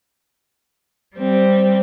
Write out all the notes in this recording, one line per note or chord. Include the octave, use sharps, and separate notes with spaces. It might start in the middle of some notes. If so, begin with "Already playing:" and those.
G3 C4